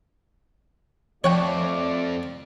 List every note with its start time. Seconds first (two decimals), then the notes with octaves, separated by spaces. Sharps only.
1.24 F2 A3 F4 C#5 D5 F#5 G5